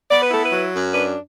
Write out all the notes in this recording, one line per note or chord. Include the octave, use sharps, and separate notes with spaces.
B3 D5
B4
E4 A4
B4
F#3
F#2
D4 B4